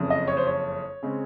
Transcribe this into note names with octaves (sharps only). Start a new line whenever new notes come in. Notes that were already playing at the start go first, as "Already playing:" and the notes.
Already playing: F#1 F2 C#3
D#5
C#5
C5
C#5
C#3 G#3 C4